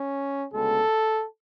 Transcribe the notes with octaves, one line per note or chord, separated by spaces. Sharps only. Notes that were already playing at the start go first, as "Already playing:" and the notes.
Already playing: C#4
D2 C#3 G#3 B3 A4